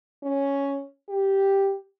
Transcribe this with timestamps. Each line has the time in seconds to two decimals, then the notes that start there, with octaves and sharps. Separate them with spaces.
0.23 C#4
1.09 G4